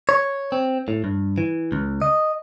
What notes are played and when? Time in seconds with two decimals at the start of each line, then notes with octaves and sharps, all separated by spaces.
0.09 C#5
0.52 C4
0.88 A2
1.04 G2
1.38 E3
1.72 C#2
2.02 D#5